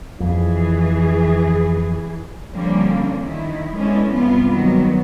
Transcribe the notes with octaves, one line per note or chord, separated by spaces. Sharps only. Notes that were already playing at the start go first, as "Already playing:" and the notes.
F2 E3 G#4
D3 F3 G3 A#3 C#4 D4
D#3 E4
G#3 A3 B3 C#4 D4 E4
G2 C3 F3 G3 B3 F4
D#3 F#3 G3 B3